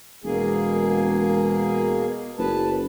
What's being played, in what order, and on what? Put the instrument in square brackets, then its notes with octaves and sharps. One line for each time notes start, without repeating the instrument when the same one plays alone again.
[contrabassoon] E1 [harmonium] B2 A#3 G#4
[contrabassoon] F#1 [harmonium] B4 A5